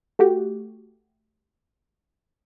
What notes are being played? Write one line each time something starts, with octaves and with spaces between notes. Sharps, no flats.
A3 F#4 G4